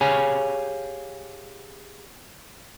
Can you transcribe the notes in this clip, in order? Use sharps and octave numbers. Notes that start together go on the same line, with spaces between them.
G4 G#4 C#5 F5 G#5